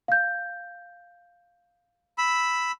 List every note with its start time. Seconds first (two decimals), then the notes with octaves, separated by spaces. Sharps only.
0.08 F5 G6
2.18 B5 E6